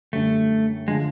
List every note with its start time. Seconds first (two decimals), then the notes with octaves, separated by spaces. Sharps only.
0.13 F#2 D3 G3 A3
0.88 D3 F3 G#3